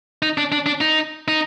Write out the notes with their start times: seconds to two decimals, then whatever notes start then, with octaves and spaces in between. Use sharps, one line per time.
0.22 D#4
0.38 D4
0.52 D4
0.66 D4
0.81 D#4
1.28 D#4